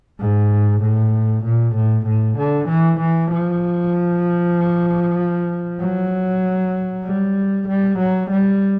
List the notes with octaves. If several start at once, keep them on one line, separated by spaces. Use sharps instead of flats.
G#2
A2
A#2
A2
A2
D3
E3
E3
F3
F#3
G3
G3
F#3
G3